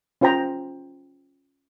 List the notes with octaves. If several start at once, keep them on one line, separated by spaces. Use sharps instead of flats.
C#4 F4 C5 G5 A#5